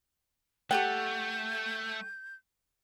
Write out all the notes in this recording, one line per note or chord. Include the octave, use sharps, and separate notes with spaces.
A3 G4 A4 F#5 G5 G6